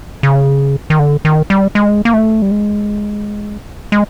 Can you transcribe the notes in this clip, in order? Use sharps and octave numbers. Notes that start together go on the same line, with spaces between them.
C#3
D#3
D3
D#3
G3
G#3
A#3
A3
G3
G#3
G#3